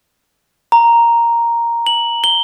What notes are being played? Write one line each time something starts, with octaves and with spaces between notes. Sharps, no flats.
A#5
F#7
G7